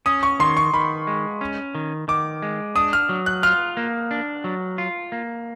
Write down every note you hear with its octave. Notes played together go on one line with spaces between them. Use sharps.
C#4 D#6
C#6
D#3 C6
C#6
D#3 B5
G#3
C#4
D#3
D#3 D6
G#3
D4 D#6
F6
F#3
F#6
F4 F6
A#3
D4
F#3
F4
A#3